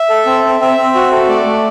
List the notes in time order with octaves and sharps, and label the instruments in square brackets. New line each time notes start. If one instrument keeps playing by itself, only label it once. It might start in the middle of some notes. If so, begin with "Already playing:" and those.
Already playing: [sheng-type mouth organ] E5
A4
C4
C4
C4 E5
C4
F#4
A4
A3 D5
A3